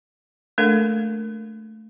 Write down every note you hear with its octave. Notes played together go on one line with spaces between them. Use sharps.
A3 A#3 D4 A4 A#4 F5